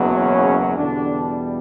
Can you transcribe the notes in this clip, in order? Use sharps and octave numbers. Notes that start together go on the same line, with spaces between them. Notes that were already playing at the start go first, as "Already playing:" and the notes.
Already playing: F#1 E2 B2 F#3
C#3 C#4
E2 B2 D3 G3 D4